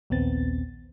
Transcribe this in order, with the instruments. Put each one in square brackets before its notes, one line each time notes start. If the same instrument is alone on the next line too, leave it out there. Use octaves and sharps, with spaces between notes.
[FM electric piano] A#1 D#2 B3 C4 A6